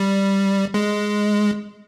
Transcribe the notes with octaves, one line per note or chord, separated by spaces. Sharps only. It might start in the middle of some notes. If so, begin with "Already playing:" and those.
Already playing: G3
G#3